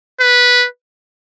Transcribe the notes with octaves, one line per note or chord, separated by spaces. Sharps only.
B4